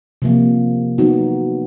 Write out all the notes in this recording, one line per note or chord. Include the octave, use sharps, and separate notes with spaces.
C3 F3 A#3
F#3 B3 D#4 F#4